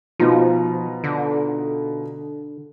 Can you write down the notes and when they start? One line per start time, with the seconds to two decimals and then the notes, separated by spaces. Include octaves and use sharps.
0.20 B2 F3 D#4 F4
1.04 D3